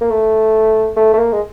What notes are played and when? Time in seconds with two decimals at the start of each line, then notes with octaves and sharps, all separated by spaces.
0.01 A#3
0.10 A3
0.97 A3
1.14 A3
1.18 A#3
1.32 G#3